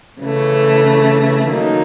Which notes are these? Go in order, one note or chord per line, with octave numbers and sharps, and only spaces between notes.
C#3 E3 A3
D#3 F#3 A#3 D#4